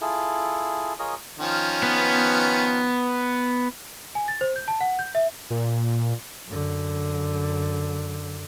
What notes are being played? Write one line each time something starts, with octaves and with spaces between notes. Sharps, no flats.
E4 F4 G#4 A4
F4 G#4 A#4 C#5 D#5
D#3 F3 C#4
B3
G#5
A6
C5
G6
A5
F#5
G6
E5
A#2
F#2 D3